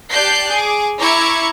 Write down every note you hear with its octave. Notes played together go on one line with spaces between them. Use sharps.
G4 D5 A5 F#6 G6 C7
G#4 D6
E4 A#5 C#6 D6 G#6 C#7